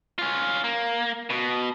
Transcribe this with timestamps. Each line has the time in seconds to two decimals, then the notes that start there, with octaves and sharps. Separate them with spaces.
0.19 C#4 F4
0.64 A#3
1.30 B2